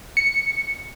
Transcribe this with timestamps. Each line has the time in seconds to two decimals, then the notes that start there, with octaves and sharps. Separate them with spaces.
0.17 C#7